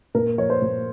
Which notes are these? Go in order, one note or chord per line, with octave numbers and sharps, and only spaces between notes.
A#2 A#4
F3 C#5
C5
A#2